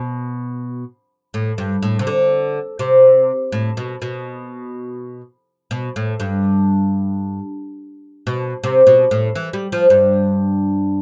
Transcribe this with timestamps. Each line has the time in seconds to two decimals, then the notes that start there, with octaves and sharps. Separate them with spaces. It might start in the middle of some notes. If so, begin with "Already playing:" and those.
Already playing: B2
1.34 A2
1.58 G2
1.83 A2
1.99 C3
2.07 D3
2.79 C3
3.52 A2
3.77 B2
4.02 B2
5.71 B2
5.96 A2
6.20 G2
8.27 B2
8.64 C3
8.87 B2
9.11 A2
9.35 E3
9.53 G3
9.72 F3
9.90 G2